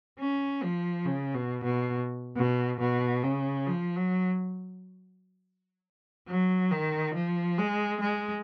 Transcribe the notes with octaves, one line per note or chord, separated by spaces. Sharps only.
C#4
F3
C#3
B2
B2
B2
B2
C#3
F3
F#3
F#3
D#3
F3
G#3
G#3